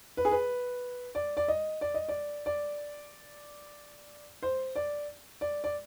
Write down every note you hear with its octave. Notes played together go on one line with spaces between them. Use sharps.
B4
G#4
B4
D5
D5
D#5
D5
D#5
D5
D5
C5
D5
D5
D5